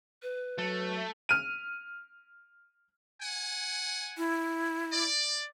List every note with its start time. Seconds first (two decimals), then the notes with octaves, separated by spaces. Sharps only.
0.23 B4
0.58 F#3 A3
1.29 F6 D#7
3.22 F#5 G#5
4.17 E4
4.93 D5